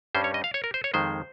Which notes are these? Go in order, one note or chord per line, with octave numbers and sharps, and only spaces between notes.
G2 G3 C#4 C5
C#5
D#5
F5
C#5
A#4
C5
C#5
F2 D#3 G#3 C5